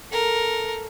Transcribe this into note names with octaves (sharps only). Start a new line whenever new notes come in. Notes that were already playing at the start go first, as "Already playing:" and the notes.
A4 A#4